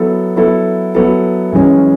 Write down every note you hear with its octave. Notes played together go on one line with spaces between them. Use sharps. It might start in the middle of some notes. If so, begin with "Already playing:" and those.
Already playing: F#3 B3 E4 A4
F#3 B3 E4 A4
F#3 B3 E4 A4
F#2 E3 G#3 C#4